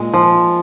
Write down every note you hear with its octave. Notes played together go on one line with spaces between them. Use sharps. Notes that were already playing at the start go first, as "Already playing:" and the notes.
Already playing: A#2 G#3
F3